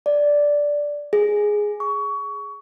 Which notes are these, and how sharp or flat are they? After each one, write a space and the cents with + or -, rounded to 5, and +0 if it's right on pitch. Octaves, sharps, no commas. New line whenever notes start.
D5 -5
G#4 +0
C#6 +25